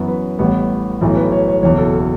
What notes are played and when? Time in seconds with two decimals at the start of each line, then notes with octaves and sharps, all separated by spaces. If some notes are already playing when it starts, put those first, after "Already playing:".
Already playing: F#2 E3 B3 C#5
0.08 B4
0.39 A1 A2 G3 B3
1.01 B1 A2 E3
1.16 B4
1.32 C#5
1.48 C#5
1.63 F#1 E2 B2 C#5
1.78 A4
1.93 A4